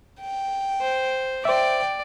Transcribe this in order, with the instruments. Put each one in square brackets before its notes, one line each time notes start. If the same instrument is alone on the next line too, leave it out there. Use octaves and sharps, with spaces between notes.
[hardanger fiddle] G5
[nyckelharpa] C5
[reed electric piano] C5 E5 [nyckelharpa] D5 [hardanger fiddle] G5